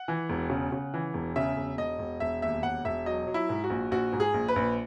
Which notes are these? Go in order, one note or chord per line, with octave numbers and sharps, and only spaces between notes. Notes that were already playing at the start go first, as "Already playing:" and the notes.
Already playing: F#5
E3
E1
C#3
C#3
E3
E1
C#3 E5
E1
E1 D#5
E1
E1 E5
D#2 E5
E1 F#5
E1 E5
F#3 D#5
F#3
E4
G#2
F#4
A#1
A#1 F#4
G#2
G#4
A#1
B4
A#1